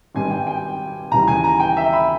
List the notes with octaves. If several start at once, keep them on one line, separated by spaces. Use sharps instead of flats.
G#1 G2 G3 G#5
G5
G5
D#2 C#3 E3 G3 A#5
G#5
A#5
G5
E5
B5